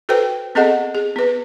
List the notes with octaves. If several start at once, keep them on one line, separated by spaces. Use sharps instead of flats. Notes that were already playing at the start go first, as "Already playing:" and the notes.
F#4 A4 B4 C5 G5
B3 C4 G#4 A4 D#5 F#5
G#4
B3 B4